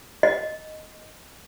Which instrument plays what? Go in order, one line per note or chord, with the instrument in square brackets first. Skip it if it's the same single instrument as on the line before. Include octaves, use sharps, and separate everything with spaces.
[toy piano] D#5